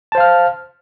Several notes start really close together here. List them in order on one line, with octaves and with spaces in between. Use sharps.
A5 C5 F5 F6